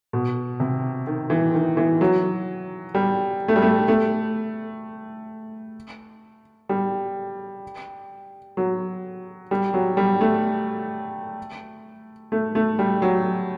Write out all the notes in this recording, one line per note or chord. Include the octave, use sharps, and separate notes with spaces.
B2
C3
D#3
E3
D#3
E3
F#3
G3
A3
G3
A3
A3
G3
F#3
G3
F#3
G3
A3
A3
A3
G3
F#3